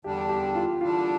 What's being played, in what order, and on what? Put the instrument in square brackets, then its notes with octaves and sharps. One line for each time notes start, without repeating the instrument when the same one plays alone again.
[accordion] E2 D3 G3 D4 [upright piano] G4
[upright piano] G4
F4
[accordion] E2 D3 G3 D4 [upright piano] F4